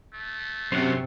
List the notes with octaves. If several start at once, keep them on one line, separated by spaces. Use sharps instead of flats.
A3
F#2 C3 C5 C#5 F#5